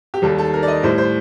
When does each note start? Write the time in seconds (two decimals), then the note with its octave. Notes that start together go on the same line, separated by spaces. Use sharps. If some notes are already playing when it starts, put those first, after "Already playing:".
0.14 G4
0.22 D#2 D#3 G3 A4
0.38 A4
0.54 A#4
0.63 D5
0.68 D#5
0.83 A2 G3 C5
0.98 C5